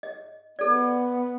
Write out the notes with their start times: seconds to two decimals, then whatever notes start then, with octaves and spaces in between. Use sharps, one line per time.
0.03 D#5
0.59 B3 A4 D5